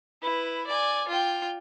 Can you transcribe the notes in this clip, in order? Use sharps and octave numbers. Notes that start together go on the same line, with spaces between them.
E4 B4
D5 G#5
F4 G5